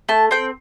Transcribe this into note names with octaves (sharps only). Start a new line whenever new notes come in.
A3 A5
C4 G5